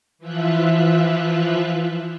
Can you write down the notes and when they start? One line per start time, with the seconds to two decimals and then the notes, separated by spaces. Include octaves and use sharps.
0.19 E3 F3 F4 E5 F#6